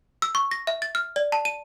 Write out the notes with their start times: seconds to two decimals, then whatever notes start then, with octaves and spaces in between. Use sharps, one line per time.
0.22 E6
0.35 C#6
0.51 A#6
0.67 E5
0.82 A6
0.95 F6
1.16 D5
1.32 A5
1.45 D#7